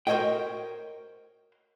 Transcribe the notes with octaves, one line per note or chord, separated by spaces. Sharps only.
F#4 A#4 C5 C#5 D#5 G5